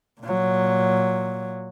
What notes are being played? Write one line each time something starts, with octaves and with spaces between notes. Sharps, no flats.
A#2 F#3